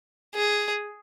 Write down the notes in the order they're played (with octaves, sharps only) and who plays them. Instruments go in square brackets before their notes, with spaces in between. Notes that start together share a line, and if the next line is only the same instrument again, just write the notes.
[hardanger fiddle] G#4